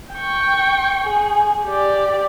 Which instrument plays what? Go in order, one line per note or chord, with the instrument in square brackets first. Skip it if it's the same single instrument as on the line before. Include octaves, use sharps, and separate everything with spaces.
[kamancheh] G5 C#6
G#4
G4 D5